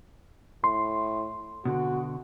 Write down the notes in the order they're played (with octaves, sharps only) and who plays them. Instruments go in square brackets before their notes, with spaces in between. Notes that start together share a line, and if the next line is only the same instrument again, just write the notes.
[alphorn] A2 [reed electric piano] C6
[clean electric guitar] B2 D3 [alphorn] F#4